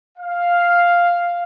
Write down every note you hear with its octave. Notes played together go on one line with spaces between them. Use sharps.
F5